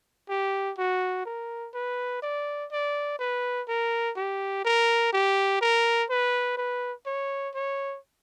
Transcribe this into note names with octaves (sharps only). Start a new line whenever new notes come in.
G4
F#4
A#4
B4
D5
D5
B4
A#4
G4
A#4
G4
A#4
B4
B4
C#5
C#5